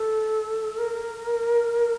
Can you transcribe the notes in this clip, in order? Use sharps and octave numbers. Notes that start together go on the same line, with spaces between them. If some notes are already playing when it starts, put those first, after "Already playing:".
Already playing: A4
A#4